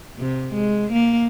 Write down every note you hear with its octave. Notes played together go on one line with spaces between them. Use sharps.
C3
G#3
A#3